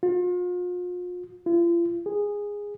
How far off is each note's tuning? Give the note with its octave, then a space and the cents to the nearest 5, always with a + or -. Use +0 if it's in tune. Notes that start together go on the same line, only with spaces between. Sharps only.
F4 +40
F4 -40
G#4 -15